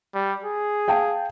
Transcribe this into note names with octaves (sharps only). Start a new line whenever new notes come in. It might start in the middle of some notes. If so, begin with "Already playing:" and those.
G3
G#4
F5 G5 A5